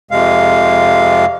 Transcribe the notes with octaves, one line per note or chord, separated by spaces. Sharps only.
F2 C3 G#3 F5